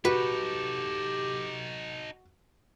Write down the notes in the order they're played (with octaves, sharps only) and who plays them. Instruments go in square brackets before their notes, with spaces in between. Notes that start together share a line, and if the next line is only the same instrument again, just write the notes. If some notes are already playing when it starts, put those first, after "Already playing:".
[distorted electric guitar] D#4 A4 [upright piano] F#4 [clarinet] G4 [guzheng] B4